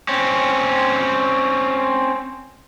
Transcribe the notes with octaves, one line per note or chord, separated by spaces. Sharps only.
C4 C#4